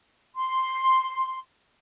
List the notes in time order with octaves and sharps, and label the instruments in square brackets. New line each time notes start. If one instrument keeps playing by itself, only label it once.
[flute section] C6